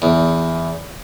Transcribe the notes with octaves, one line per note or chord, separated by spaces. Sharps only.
E2